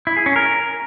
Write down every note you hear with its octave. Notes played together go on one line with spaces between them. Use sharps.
E4
G#4
C#4
A#4